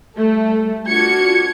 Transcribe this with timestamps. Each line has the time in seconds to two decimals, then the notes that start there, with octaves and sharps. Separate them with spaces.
0.17 G3 A3 A4
0.87 D4 F4 F#4 G#6 C#7